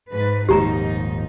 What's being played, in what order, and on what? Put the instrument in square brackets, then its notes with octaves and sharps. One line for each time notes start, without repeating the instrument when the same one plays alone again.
[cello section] G#2 B4
[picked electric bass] D#1 D#2 G#2 [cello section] F3 D#4 [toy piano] G4 A#5